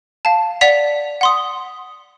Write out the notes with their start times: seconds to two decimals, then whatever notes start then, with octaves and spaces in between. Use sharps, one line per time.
0.25 F5 A5
0.61 D5 F#5 B6 F7
1.21 F#5 C6 D#6